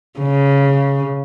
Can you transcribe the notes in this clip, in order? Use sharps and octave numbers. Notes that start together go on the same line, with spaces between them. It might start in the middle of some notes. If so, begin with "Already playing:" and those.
C#3